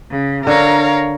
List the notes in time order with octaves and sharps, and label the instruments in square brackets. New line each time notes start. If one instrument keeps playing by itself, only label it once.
[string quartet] C#3
[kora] D3 [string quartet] A#4 C#5 F5